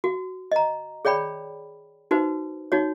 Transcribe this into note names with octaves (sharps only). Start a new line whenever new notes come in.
F#4
D#5 A#5
G#4 C#5 D5 G5 B5
D#4 F#4 B4 C5
D#4 F#4 C#5